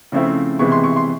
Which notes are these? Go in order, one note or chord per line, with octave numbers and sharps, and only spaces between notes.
C#3 F3 A3 C4 E4
C3 E3 G#3 B3 C#6
C6
C#6
C6